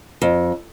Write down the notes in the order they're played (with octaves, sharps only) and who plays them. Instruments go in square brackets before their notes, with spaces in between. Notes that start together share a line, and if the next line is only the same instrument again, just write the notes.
[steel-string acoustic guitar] F2